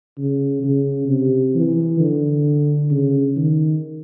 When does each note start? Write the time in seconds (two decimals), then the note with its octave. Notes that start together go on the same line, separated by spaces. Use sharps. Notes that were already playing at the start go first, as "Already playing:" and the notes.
0.18 C#3
0.64 C#3
1.08 C3
1.55 E3
2.00 D3
2.90 C#3
3.37 D#3